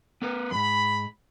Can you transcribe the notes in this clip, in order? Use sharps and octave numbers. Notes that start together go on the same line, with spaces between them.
B3 A#4 B4
E2 G#2 B5